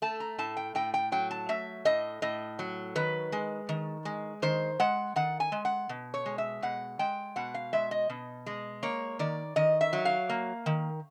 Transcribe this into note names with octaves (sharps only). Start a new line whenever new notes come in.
A3 A5
A#5
A2 A5
G5
A2 G5
G5
F#3 G5
A5
A3 E5
A2 D#5
A2 D#5
F#3
D#3 B4
G#3
D#3
G#3
D#3 C5
G#3 F#5
D#3 F#5
G#5
G#3
F#5
B2
C#5
G#3
E5
B2 F#5
G#3 G5
B2 F#5
F5
G#3 E5
D#5
B2
G#3
A#3 C#5
D#3 D5
D#3 D#5
E5
F#3
F5
A#3
D#3